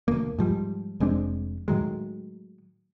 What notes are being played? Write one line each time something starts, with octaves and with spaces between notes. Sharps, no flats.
E1 D2 A#3
G#2 F3 G3
F1 G#3 C4 D4
A2 D#3 F#3 G#3